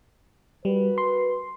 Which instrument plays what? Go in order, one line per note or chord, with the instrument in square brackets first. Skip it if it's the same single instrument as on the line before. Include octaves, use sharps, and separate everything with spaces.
[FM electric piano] G3 [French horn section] F#4 A#4 B4
[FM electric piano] C6